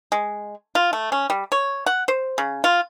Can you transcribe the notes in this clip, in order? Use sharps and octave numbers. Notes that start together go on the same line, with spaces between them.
G#3
F4
A3
C#4
G3
C#5
F#5
C5
C#3
F4